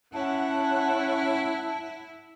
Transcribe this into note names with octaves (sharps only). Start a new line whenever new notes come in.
C#4 E4 F#5 A5